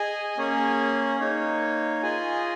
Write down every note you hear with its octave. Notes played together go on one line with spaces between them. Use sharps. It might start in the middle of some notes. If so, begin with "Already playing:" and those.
Already playing: G#4 D#5 G#5
A#3 C#4 G#4 C#5
A#3 D#4 C#5
F4 G#4 D#5 G#5